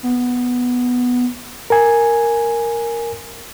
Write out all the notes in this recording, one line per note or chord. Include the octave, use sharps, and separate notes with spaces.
B3
A#4 G#5